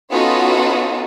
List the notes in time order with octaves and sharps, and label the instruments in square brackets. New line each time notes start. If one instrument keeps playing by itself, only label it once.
[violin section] B3 C#4 D#4 F4 F#4 A4